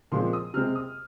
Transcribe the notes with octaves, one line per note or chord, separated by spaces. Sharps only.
A#2 F3 G#3 C4 C6
D#6
C3 G#3 C4 F6
D#6